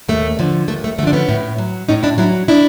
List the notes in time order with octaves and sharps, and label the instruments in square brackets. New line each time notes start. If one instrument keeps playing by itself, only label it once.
[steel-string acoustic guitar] D#2 A3
D3 F3
D#2 A3
A3
D3 A3
F3 D4
B3 C#4
A2
F#3
A2 C#4 D#4
D4 E4
F#3 D4 E4
D4 E4